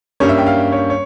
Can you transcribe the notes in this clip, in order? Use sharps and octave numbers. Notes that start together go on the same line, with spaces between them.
G2 G3 A#3 C#4 C#5
E5
G5
F5
C#5
C#5